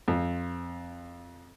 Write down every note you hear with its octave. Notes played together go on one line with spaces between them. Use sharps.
F2